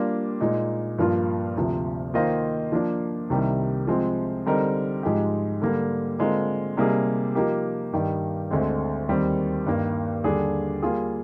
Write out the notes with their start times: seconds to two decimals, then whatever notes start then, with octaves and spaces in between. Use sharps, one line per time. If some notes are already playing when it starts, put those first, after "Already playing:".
Already playing: G3 A#3 D4 F4
0.40 A#2 G#3 D#4
0.98 G2 F3 A#3 F4
1.56 D2 C3 F3
2.14 D#3 A#3 F4 C5 D#5
2.72 F3 A#3 D4
3.30 C2 C3 D#3 G3
3.87 C3 F3 G#3 C4
4.46 D3 G3 C4 D#4 A#4
5.03 G#2 F3 G#3 D#4 G4
5.61 D3 G3 A#3
6.19 D3 G#3 C4 F4 A#4
6.77 C3 G3 A#3 D#4 G#4
7.35 F3 A#3 D#4 G4 A#4
7.93 G2 D#3 G3
8.51 D2 D3 G#3 C4
9.08 D#2 D#3 G3 C4
9.66 G2 D#3 A#3
10.24 D#2 D3 G3 D4 G#4
10.82 G3 A#3 F4 G#4